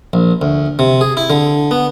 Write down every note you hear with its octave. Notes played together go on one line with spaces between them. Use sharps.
A#1
D2
C3
G#4
E4
D3
B3